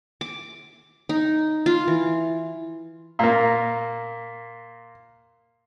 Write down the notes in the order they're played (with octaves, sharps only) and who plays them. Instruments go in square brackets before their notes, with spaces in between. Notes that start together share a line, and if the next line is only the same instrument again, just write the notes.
[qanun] D6
D#4
F4
E3
[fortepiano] A#2 A#3